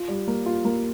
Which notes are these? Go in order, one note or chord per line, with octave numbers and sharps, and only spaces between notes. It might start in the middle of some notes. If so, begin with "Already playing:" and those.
Already playing: F4
G3
A#3
F4
A#3